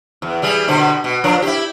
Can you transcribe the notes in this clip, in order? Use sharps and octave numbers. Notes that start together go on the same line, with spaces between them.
E2
E3 G3 G#4
B2 D3 C5
B2
F3 D4 A#4
E4 G4